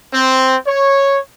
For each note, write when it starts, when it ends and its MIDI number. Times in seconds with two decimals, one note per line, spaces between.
0.12 0.55 60
0.67 1.18 73